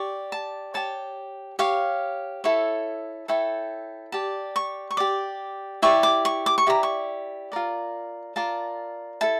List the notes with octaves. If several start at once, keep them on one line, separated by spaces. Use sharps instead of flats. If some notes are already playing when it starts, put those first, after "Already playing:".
Already playing: G4 D5 C#6
A5
G4 C#5 A5
G4 C#5 F5
E4 A4 C#5
E4 A4 C#5 G5
G4 D5 A5
C#6
C#6
G4 D5 D6
E4 G4 D5 C#6
D6
C#6
D6
C#6
E4 G4 D5 A#5
C#6
F4 A#4 D5
F4 A#4 D5 A5
E4 A4 A5